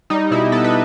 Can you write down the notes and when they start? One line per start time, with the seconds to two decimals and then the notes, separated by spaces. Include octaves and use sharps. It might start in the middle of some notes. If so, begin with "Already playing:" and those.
0.10 G3 D#4
0.31 B2 E4
0.52 B3 A4
0.64 B4